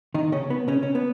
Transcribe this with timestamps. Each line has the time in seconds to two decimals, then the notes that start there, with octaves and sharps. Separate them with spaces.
0.14 D#3 D#4
0.32 C#3 C#4
0.50 B3
0.68 C#3 C#4
0.83 C#4
0.95 B3